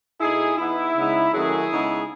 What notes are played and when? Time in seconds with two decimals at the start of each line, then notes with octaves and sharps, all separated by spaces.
0.20 B2 A3 D#4 E4 G#4
0.58 E3 B3 D#4 E4
0.95 C#3 G#3 B3 D#4
1.33 D#3 F#3 A3 C#4 E4 G#4
1.71 C#3 G#3 B3 D#4